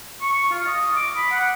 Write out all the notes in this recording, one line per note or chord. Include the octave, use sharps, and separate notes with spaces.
C#6
F4
D#5
D6
B5
F#5